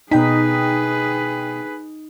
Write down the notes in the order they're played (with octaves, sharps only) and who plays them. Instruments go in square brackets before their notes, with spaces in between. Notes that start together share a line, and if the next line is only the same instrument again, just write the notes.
[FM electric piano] B2 G5 B6 [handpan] D#4 [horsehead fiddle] G#4 B4